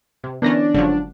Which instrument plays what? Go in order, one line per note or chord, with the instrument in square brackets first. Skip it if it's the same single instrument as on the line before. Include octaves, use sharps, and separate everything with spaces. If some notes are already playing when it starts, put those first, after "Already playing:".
[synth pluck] C3
[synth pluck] D3 E3 C#4 [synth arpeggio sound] B3 A#4 A#6 [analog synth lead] D4
[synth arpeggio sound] G1 G#3 C#4 [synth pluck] D3 F3 F#3